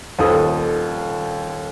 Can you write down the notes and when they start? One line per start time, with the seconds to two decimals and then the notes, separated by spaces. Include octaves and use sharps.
0.18 D#1 D#2 F3 A4 C5 D#6